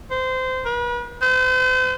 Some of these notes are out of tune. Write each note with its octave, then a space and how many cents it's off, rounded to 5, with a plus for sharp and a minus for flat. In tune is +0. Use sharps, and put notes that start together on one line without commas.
C5 -20
B4 -40
C5 -40